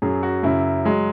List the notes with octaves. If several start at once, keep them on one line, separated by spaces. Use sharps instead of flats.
F#2 F#3 G#4
F#4
F#2 C#3 F#3 E4
F#3 G#3